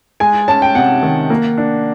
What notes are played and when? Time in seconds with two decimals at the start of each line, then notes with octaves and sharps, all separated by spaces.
0.20 G#3 G#5
0.48 C#4 A5
0.62 G5
0.75 C3 F#5
1.03 D#3
1.30 A#3
1.58 D4